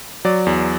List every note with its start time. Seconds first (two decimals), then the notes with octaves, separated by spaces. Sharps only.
0.25 F#3 D5
0.47 E2